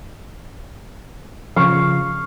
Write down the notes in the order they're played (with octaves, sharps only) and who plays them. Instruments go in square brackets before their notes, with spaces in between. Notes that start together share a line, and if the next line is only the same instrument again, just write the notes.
[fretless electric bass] C#3 F3 [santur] F5 C#6